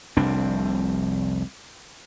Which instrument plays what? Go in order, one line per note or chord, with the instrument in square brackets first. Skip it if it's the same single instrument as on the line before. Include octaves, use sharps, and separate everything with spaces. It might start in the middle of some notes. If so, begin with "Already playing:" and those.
[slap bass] F1 C2 C4 D4